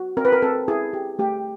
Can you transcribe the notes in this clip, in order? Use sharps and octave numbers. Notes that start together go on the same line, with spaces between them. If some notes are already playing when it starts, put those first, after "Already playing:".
Already playing: F#4
C4 A#4
B4
A#4
C4 A4
E4 G#4
G4
A3 G4